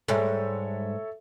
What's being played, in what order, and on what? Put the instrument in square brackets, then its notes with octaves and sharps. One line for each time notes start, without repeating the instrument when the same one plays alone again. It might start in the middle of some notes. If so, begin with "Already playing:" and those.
[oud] G#2 G3 [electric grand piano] A4 C#5 E5